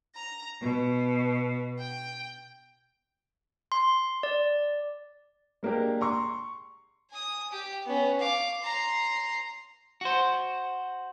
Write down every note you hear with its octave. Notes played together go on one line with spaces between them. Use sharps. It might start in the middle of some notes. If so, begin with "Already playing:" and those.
A#5
B2
G5
C6
D5
G#3 A#3 D4 G4 A#4
A#5 C6 C#6
G#5 D#6
G4 G5
B3 C#4
F5 D6
A#5 C6
F#4 C5